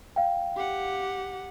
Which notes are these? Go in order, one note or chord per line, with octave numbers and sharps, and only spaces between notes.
F5 G5
G4 F#5